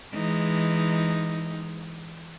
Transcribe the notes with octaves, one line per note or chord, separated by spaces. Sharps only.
E3 G#3 D#4